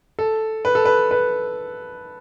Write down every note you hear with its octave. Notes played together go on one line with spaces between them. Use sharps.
A4
B4
A4
B4
B4